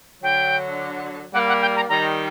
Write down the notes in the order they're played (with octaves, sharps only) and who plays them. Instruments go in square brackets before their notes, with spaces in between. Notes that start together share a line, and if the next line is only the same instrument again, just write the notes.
[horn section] D3 F#3 [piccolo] G5
[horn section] G3 A#3 [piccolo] F#5
[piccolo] F#5
G5
A#5
[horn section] D#3 G3 [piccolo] A#5